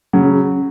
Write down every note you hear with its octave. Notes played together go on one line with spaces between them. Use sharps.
C#3 F#3